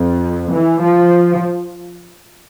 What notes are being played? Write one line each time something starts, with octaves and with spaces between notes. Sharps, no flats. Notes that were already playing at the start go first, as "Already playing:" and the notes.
Already playing: F2
E3
F3